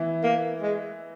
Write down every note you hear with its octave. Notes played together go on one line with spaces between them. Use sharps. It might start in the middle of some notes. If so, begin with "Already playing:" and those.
Already playing: E3 B3 E4
A#3
G#3